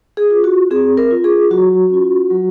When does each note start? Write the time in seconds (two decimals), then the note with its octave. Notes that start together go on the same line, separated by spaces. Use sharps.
0.17 G#4
0.30 F4
0.44 F#4
0.71 C4 G#4
0.97 A#4
1.11 F4
1.24 G#4
1.50 F#3 F#4
1.90 C#4 F4
2.31 F#3